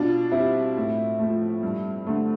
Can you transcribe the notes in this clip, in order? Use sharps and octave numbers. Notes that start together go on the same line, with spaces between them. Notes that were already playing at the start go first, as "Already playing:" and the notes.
Already playing: B2 D4 F4
G3 C4 E4
A2
F3 A3
G2
D3 A3